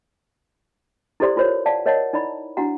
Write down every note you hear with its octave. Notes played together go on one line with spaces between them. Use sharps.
E4 G4 A4 C5 D5 C6
E4 F4 A#4 C5 C#5
D5 F5 F#5 A5
A#4 C#5 D#5 F5 F#5 A5
D#4 E4 D5 B5
D4 E4 F#4 F#5 A#5